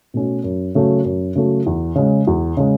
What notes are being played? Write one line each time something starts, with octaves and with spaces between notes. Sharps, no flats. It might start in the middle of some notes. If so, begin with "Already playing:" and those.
B2 A3 C#4
F#2
C#3 F#3 A3
F#2
C#3 F#3 A3
E2
C#3 G#3
E2
C#3 G#3